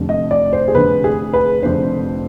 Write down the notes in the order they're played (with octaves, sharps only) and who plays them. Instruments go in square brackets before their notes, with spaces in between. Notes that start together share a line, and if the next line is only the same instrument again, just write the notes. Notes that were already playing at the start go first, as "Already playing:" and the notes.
Already playing: [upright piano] F1 F2 D3
D#5
D5
C5
G#4
F1 F2 D3 B4
G#4
B4
F1 F2 D3 C5